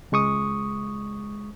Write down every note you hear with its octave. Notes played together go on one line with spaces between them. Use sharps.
C#2 G#3 C#6 D#6